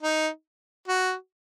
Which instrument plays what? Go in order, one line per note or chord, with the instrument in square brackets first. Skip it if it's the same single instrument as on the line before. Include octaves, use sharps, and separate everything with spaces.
[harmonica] D#4
F#4